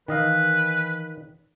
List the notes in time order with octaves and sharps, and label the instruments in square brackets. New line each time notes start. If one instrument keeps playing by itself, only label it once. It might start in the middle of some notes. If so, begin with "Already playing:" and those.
[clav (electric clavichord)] D#3 D#5 F5 [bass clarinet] E3 [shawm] B4